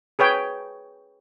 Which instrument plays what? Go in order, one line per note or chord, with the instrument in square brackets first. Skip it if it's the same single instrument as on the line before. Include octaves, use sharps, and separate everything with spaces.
[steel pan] G#4 B4 C#5 G5